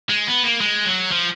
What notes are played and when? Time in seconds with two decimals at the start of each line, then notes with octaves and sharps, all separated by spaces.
0.10 G#3
0.28 B3
0.44 A#3
0.61 G#3
0.86 F#3
1.12 F3